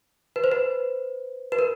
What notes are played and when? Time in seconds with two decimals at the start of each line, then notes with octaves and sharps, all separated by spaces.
0.36 B4
0.44 C5
0.52 B4
1.52 B4
1.59 A#4